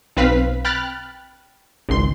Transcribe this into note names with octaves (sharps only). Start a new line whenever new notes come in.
B1 C4 B4 F5 B6
G5 B5 F6 F#6 A6
G#1 C#2 C6